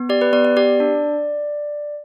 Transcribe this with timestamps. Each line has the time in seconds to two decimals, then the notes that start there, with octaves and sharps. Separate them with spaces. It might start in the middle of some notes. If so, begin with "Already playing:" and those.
Already playing: B3
0.09 G4 D5
0.21 B4
0.33 B3 D5
0.45 D5
0.57 G4 D5
0.80 D4